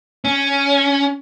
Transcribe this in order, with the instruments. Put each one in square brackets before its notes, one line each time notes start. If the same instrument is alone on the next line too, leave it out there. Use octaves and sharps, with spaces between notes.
[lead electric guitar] C#4